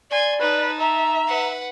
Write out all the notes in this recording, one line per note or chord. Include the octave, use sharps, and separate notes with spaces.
D5 G#5 C6
D#4 B4 A5
E5 A#5
B4 F#5